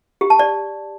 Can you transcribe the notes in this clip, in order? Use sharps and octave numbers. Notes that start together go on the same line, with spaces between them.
G4
A5
D5